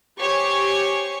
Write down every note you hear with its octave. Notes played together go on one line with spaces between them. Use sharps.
G4 C5 C#5 G#5 C#6